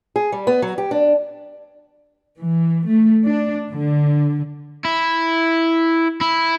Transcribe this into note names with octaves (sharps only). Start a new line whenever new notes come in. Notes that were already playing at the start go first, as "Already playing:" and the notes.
G#4
G3
B3
F#3
G4
D4
E3
A3
D4
D3
E4
E4